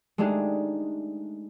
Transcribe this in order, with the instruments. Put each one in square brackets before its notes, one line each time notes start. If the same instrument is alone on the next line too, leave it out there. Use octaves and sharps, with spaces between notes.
[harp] G#3 A3 D4 D#4 G4 G#4